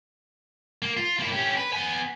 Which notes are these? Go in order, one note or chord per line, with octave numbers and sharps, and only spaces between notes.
A#3
F4
A#3 E4
C#4 G4
B4
B3 G#5